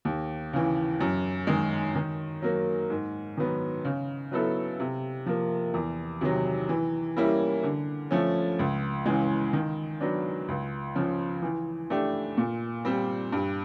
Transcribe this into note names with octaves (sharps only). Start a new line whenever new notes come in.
D#2
C#3 E3
F#2
D#3 G#3
D#3
F#3 A#3
G#2
D#3 F#3 B3
C#3
F#3 B3 E4 A4
C3
F3 A#3
E2
C3 D#3 F#3
E3
G3 A#3 C#4 E4
D3
F3 A3 C#4
C#2
C#3 E3 G#3
D#3
F#3 B3 D4
C#2
C#3 F3
E3
A3 D4 G4
A#2
G3 C4
G2